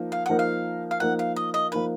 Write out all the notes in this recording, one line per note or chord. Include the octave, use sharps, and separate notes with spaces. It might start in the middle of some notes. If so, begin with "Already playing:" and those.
Already playing: F3 A#3 D#4
F5
F3 A#3 D#4 A#4 F#5
F5
F5
F3 A#3 D#4 A#4 F#5
F5
D#5
D#5
F3 A#3 D#4 A#4 B4